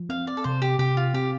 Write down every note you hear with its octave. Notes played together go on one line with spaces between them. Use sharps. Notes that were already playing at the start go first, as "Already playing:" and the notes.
Already playing: F3
C4 F5
D5
A4
C3 C5
G4
C3 G4
F4
C4 G4